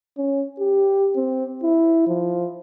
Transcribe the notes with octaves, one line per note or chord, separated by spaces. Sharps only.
C#4
G4
C4
E4
F3